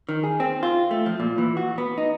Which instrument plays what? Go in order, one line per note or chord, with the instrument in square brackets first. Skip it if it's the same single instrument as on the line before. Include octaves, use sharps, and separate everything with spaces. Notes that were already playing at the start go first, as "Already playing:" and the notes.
[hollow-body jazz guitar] D#3
G#4
C4
F4
A3
F3
A#2
E3
F#4
B3
D#4